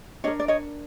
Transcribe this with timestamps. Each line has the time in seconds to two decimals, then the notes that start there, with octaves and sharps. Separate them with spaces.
0.24 D4 G4 A#4 C#5 D#5
0.40 D5
0.48 C#5 D#5